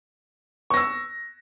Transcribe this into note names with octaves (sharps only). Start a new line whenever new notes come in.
C#6 E6 A#6